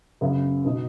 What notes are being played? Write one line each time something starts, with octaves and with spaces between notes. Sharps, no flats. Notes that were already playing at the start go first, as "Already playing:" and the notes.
F#2 C#3 B3
B2 B3 D#4 F#4